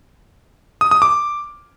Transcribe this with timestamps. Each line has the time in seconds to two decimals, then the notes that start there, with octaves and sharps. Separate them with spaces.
0.81 D#6
0.91 D#6
1.02 D6